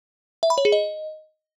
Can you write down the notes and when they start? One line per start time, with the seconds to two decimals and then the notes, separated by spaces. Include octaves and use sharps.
0.43 E5
0.50 B5
0.58 C#5
0.65 G#4
0.72 D#5